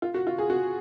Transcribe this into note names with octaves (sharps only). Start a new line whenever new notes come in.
F4
F#4
F4
G#4
F#4